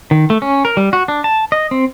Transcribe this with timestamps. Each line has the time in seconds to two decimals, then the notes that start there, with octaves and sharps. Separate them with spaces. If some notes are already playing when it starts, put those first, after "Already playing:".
0.11 D#3
0.30 A3
0.42 C#4
0.65 A#4
0.77 G3
0.93 F#4
1.08 D4
1.24 A5
1.52 D#5
1.71 C4